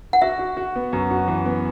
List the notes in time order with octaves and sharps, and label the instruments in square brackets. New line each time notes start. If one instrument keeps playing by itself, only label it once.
[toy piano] F#5
[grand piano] F#4 [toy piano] E5
[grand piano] F#4
F#4
B3
F#2
F#4
E3
B3